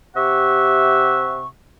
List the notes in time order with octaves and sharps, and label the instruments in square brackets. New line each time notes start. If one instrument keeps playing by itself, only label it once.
[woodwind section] C3 G4 E5 F#5 C#6